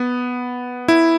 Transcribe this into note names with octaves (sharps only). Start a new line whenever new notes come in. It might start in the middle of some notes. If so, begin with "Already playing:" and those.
Already playing: B3
E4